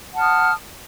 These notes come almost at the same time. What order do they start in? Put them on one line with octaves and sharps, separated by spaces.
F#5 A5 F6 D#6